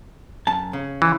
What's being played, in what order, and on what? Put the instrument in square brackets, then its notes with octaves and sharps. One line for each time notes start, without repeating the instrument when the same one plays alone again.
[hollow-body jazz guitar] F#2 A5
C#3
[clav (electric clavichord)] E3